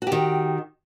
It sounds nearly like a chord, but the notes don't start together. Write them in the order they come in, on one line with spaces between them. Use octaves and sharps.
F#4 G4 D#3